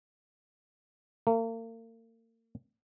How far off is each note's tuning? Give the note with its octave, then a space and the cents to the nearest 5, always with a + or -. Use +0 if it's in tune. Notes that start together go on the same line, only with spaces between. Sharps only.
A#3 -40